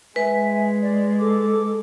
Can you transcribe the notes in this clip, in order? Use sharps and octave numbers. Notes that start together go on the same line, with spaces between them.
G#3 B4 E5 G#5
D5
A4 D6